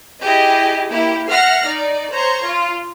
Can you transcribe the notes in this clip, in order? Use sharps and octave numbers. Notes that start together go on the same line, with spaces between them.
E4 G4 G#4 D#5
A#3 E4 G4
E5 F#5 F6 A#6 C7
D#4 D5
C5 C#5 A#5 C6 C#6
F4